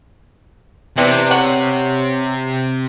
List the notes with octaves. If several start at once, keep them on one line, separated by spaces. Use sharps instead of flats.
C3 E3 C4 D4
C#5 F#5